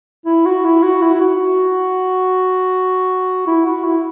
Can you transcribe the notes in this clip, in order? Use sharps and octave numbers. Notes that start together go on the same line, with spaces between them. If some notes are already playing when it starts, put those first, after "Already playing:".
E4
F#4
E4
F#4
E4
E4
F#4
E4
F#4
E4